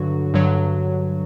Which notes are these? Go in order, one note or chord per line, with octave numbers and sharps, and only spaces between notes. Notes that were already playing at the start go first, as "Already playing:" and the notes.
Already playing: G2 D3 F#3 F#4
G2 D3 F#3